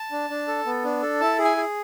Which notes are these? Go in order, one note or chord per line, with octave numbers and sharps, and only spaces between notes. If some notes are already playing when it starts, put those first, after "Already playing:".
Already playing: A5
D4
D4
A4
B3
D4
A4
E4 A5
G#4
G#5
G#4